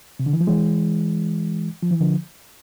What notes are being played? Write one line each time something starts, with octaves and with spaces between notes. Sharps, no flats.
C3
D3
E3
F3
E3 G#3
F3
E3
D3 F3